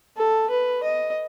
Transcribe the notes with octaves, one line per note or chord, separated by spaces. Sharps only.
A4
B4
D#5